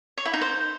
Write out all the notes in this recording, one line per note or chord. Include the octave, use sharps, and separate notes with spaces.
C#5
E4
D#4
C5